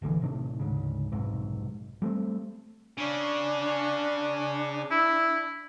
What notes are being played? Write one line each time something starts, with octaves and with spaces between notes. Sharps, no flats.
F1 A#1 D3 E3
A2 C3 D#3 D4
D2 G#2 C#3
F1 B1 G#2 C3
G3 A3 B3 C4
C#3 C#4 D4
E4